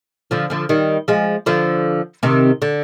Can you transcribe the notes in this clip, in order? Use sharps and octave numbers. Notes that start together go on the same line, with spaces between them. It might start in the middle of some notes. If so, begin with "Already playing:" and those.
D3 F3
D3 F3
D#3 G3
F3 G#3
D3 F3
C3 D#3
D3